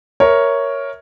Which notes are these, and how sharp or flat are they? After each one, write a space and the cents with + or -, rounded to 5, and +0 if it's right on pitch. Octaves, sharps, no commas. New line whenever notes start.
A#4 +5 C#5 +0 E5 -10